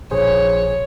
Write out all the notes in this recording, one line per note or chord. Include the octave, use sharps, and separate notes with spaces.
A#1 G#4 C5 C#5